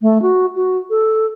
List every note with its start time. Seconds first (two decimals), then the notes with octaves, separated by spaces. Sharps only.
0.01 A3
0.22 F#4
0.55 F#4
0.90 A4